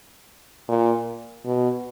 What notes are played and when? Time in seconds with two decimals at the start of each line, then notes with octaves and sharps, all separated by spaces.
0.68 A#2
1.45 B2